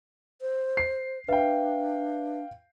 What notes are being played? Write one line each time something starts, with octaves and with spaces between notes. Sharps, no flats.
C5
C7
D4 B4 E5 F5 G5